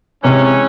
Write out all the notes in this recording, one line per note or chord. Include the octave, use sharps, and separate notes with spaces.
C3 E3 G#3 C#4